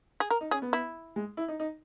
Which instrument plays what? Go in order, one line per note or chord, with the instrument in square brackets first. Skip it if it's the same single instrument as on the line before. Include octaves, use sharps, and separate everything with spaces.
[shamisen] G#4
A#4
[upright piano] D#4
[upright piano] C#4 [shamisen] G#4
[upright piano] B3
[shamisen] E4
[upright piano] G#3
E4
D#4
D#4